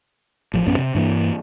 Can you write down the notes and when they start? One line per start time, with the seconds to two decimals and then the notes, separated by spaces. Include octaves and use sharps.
0.54 A1 F3
0.66 A1 F#2 B3 C#4
0.78 C3
0.95 G2 E3 A#3